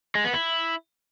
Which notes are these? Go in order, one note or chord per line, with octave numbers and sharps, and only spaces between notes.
G#3
B3
E4